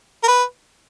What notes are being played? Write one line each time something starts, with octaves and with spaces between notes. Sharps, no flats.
A#4
B4